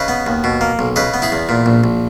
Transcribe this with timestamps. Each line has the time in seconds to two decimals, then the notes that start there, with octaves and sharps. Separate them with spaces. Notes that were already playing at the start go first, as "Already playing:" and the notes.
Already playing: C#3 B4 D#5
0.08 B3
0.27 D#2
0.44 B2
0.61 A#3
0.79 B1
0.96 C#3 B4 D#5
1.14 B3
1.22 E4 G#4
1.32 E2
1.49 A#2
1.66 A#1
1.84 A#1